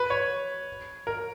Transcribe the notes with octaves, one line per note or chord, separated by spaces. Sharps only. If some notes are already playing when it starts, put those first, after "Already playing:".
Already playing: B4
C#5
A#4